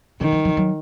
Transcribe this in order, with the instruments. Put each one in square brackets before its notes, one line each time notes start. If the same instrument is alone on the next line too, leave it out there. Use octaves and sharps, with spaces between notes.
[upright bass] D3 [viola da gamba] D#3
[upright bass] F3
F3
F#3